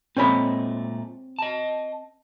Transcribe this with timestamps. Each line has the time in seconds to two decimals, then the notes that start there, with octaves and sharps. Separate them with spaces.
0.17 A#2 G#3 A3 C4 C#5 B5
1.39 D#5 A5